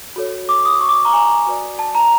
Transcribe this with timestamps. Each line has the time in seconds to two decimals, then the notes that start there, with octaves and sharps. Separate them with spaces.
0.16 F#4 A4 C#5
0.49 D6
0.65 D#6
0.81 C#6
0.89 D6
1.05 A#5
1.13 G#5
1.47 F#4 B4 D5
1.79 A5
1.95 A#5